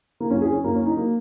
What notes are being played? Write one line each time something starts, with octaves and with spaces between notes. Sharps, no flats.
A#3
F#2 F#3 C#4
G#4
C#4
F#2 F#3 A#3
C#4
D#4
F#3 A#3